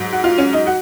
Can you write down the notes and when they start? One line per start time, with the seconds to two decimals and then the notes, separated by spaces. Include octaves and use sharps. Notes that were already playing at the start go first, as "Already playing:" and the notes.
Already playing: G#2 F#3
0.12 F#4
0.24 F4
0.38 C#4
0.53 D#4
0.67 F#4